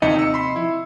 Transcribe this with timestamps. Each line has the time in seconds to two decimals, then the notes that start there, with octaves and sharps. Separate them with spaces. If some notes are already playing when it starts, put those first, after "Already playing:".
0.02 D#2 C3 F3 D#4 D#5 C#7
0.19 E6 C#7
0.34 B5 C6
0.56 E4